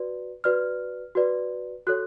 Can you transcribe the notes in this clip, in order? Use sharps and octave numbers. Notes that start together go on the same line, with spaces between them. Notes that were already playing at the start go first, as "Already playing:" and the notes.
Already playing: F#4 B4 D5
F#4 B4 D5 F6
F#4 B4 D5
F#4 A4 C#5 F#6